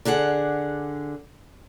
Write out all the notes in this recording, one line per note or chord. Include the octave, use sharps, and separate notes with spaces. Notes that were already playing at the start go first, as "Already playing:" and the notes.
D3 D4 G#4 F#5